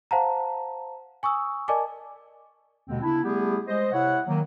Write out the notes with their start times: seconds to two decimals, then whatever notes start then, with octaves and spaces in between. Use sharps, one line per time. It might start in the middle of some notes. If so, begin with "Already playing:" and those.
0.11 C5 F5 F#5 A5 A#5
1.23 G#5 C#6 D#6 E6
1.68 A#4 D5 D#5 G#5 A5 D6
2.88 D#2 B2 D3 G#3 C4
3.02 C#3 B3 D4 E4
3.24 G3 A3 B3 E4 G4 G#4
3.67 G#3 C5 D#5
3.93 C3 E4 C#5 F#5
4.27 D#3 F#3 A#3